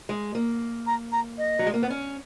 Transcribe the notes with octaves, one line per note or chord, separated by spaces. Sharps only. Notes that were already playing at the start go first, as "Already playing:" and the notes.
G#3
A#3
A#5
A#5
D#5
F#3
G#3
A#3
B3
C#4